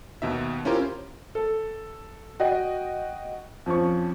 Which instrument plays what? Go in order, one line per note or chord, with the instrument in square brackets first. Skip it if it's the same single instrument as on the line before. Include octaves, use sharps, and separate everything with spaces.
[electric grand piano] D#2 B2 D#4 E5
C#4 E4 F4 G4 A#4 C5
[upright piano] A4
F#4 D#5 G5
F2 F3 C#4 C#6